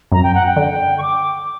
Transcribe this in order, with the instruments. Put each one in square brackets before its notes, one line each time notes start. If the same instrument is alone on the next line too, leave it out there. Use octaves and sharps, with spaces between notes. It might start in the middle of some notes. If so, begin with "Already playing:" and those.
[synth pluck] F#2 [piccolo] A#5
[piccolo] G5
F#5
G5
[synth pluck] D3
[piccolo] C#6
D6